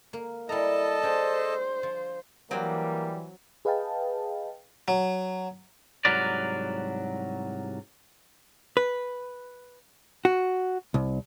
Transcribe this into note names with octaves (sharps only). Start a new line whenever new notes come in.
A#3
G3 E4 A4 D#5 A5 A#5
D4 G#4 C5 G5
F3
E3 F#3 G3 A#3 C4
G#4 B4 D#5 F5 G5 A5
F#3
C2 G#2 F#3 A#4 B4 D5
B4
F#4
C2